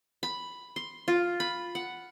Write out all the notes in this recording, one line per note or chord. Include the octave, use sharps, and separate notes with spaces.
B5
C6
F4
B5
F#5